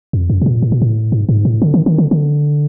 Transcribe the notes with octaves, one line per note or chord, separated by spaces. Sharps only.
F2
F#2
A2
A#2
A2
A#2
A2
G#2
G#2
A2
D3
D#3
D#3
D3
D3